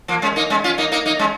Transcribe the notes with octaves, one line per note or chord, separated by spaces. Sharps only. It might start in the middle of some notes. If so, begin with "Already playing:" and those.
F3 A#3
G#3 C#4
A#3 D#4
G#3 C#4
C#4 F4
A#3 D#4
A#3 D#4
A#3 D#4
G#3 C#4